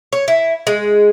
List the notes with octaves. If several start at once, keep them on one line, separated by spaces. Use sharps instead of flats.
C#5
E4
G#3